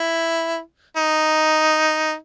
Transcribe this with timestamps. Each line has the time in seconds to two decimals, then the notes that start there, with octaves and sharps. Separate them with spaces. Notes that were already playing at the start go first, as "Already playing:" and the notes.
Already playing: E4
0.97 D#4